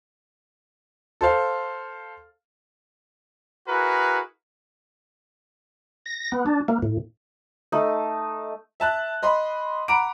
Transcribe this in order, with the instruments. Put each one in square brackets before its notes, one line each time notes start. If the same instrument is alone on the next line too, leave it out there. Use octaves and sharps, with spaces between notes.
[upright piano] A4 C5 F5
[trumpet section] E4 F#4 G#4 A#4 B4
[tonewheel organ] A#6
B3
D4
A#3
A2
[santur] A3 D#4
[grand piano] E5 A5 F#6
D#5 B5 C6
F#5 A#5 B5 D6 D7